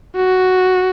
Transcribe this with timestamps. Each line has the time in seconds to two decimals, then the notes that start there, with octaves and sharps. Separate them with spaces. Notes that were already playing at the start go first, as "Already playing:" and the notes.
0.16 F#4